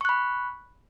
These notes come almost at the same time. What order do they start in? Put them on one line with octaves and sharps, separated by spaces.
C#6 F#6 B5